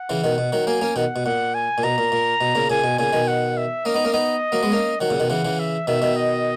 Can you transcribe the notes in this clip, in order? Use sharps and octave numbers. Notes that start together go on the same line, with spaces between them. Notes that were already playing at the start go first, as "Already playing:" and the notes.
Already playing: F#5
C#3 E3
B2 D#3
B2
D#3 F#3
F#3 A#3 G#5
A#3 C#4
B2 D#3 F#5
B2
A#2 F#5
G#5
A#2
B2 A#5
A#2
A#2
B2
A#2 C#3
A#2 C#3 G#5
B2
A#2 C#3 G#5
B2 D#3
F#5
E5
A#3 C#4 D#5
B3 D#4
A#3 C#4
B3 D#4 D#5
F#3 A#3
G#3 B3
A#3 C#4
D#3 F#3 F#5
A#2 C#3
B2 D#3
C#3 E3 F#5
C#3 E3
E5
B2 D#3 E5
B2 D#3
D#5